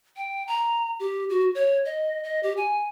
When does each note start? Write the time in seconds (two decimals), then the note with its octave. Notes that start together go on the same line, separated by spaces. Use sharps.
0.17 G5
0.47 A#5
1.00 G4
1.30 F#4
1.55 C#5
1.85 D#5
2.23 D#5
2.43 G4
2.57 G#5